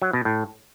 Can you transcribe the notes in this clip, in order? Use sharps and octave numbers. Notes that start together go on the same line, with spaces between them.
F#3
B2
A2